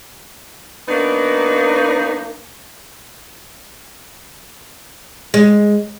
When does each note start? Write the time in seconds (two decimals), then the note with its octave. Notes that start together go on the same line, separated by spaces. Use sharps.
0.89 F#3 A#3 B3 D4 D#4
5.34 G#3